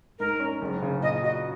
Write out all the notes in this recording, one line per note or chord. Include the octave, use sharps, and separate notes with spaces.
G#2 A#4
C#4
F#1
C#3
A#2 D#5
F#4 D#5